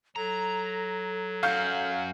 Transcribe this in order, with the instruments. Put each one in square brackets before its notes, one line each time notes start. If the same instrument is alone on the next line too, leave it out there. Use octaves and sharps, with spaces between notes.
[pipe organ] F#3 [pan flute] A4 [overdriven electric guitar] A#5
[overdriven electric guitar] F#2 F#4 [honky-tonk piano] F5 G6